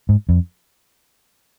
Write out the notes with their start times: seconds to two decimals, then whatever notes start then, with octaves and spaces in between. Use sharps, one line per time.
0.09 G#2
0.29 F2